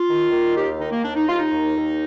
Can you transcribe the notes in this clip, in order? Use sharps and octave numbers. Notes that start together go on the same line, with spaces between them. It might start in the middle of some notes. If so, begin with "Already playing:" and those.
Already playing: F4
D#3
D#3
D#2 G4
D#3 D#4
A#3
D#2 D4
D#4
D#2 F4
D#4
D#2
D#2